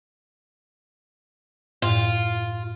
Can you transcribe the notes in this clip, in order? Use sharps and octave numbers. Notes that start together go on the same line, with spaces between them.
F#2 A2 F4